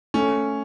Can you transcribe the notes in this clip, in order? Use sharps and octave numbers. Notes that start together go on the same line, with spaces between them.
A3 C#4